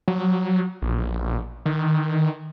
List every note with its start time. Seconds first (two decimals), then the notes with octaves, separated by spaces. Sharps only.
0.08 F#3
0.82 A#1
1.66 D#3